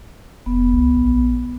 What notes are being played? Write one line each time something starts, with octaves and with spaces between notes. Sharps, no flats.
F1 B3
C2
A#1